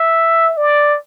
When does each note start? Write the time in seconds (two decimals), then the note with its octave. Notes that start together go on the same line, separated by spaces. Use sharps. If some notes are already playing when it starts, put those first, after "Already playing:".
Already playing: E5
0.57 D5